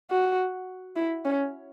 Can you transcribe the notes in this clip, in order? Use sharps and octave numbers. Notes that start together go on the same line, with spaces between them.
F#4
E4
C#4